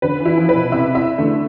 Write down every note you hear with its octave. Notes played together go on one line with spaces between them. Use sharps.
D3 B4
E3
E4
F3
B4
B2
C3 E5
E5
D3 A3